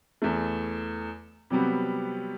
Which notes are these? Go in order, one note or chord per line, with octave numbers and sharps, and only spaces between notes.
E2 A3
C3 F#3 G3 B3